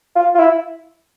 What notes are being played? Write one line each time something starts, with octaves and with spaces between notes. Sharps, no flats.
F4
F4
E4